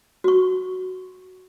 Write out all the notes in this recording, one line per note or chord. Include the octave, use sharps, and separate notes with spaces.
F#4 C#6